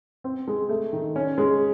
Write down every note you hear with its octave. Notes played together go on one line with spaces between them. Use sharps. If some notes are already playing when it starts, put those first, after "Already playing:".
C4
G#3
A3
D#3
C#4
G#3